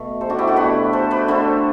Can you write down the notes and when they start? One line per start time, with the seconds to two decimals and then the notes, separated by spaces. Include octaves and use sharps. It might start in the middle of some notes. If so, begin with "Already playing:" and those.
Already playing: B2 A3
0.21 A4 C5
0.30 D4 F#4
0.39 E4 G4
0.48 F#4 A4
0.56 B2 A3 G4 B4
0.93 A4 C5
1.11 B4 D5
1.28 D3 A3 A4 C5